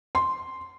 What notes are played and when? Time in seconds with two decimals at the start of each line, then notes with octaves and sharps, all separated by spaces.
0.15 C6